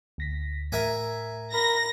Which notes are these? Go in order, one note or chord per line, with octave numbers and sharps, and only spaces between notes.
D2 A#6 B6
A2 A#4 E5 G#5
A#4 B5 A#6